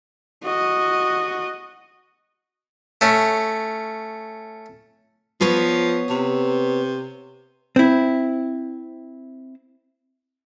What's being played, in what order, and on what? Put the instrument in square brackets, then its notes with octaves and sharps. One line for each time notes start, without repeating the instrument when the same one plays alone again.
[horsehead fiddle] F#4 D#5
[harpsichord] A3 C#4
[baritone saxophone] F3 [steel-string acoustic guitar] B3 B4 C#5
[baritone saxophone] C3
[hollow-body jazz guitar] C4 E4